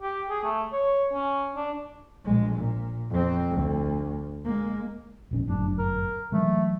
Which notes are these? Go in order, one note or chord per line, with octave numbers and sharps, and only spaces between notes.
G4
G#4
A3
C#5
C#4
D4
A#1 G#3
A#2
F2 C4
D2
G#3 A#3
E1 A#1 C#4
G1 F#2 A2 D4
A#4
E3 F#3 G#3 A3